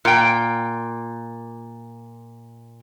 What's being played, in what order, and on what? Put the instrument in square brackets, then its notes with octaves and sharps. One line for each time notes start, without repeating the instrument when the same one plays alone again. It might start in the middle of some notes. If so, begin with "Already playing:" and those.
[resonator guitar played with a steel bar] A#2 G5